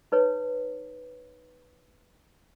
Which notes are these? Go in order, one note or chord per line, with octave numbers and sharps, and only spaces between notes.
D#4 B4 C#5